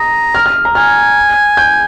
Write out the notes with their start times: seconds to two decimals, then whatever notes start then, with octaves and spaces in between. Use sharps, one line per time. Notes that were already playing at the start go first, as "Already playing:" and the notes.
Already playing: A#5 D#6
0.35 F6
0.46 F6
0.65 A#5
0.75 G#5 F6
1.57 G6